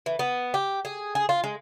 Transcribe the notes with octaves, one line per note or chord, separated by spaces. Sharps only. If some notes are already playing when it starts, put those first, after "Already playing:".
E3
B3
G4
G#4
G#4
F4
G#3